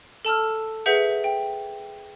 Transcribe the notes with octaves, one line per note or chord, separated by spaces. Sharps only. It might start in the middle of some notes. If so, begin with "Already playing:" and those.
A4 A5 E6 F6
G#4 B4 E5 F#5 G6 B6
G5